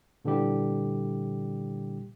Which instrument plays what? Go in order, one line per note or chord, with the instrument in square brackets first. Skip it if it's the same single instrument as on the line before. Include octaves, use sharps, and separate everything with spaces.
[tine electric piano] A#2 D3 E3 G3 G4